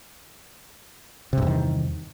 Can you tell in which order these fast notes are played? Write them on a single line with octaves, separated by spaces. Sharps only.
C3 G2 E2 D#3